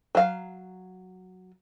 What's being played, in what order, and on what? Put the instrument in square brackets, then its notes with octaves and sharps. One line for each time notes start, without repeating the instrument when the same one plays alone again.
[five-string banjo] F#3 F5